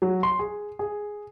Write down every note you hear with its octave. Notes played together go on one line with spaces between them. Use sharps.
F#3
C6
G#4
G#4